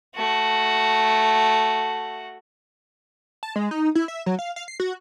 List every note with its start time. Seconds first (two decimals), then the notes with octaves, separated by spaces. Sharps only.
0.15 A3 F#4
3.43 A5
3.56 G#3
3.71 D#4
3.95 E4
4.08 E5
4.26 F#3
4.39 F5
4.56 F5
4.68 C7
4.80 F#4